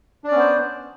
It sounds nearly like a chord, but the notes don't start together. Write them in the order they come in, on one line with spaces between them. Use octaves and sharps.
D4 D5 C#4 B3 C5